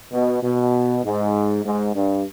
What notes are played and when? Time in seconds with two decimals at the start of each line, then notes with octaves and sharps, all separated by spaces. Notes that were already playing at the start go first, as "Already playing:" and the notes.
0.12 B2
0.43 B2
1.04 G#2
1.64 G#2
1.96 G2